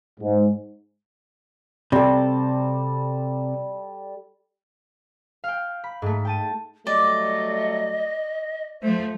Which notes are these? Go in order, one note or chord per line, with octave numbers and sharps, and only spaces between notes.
G#2
C3 G3 A4
F5 G5
B5
G#2 A3
G5 A5 D#7
F#3 G3 A3 D5 D#5
F3 A3 C5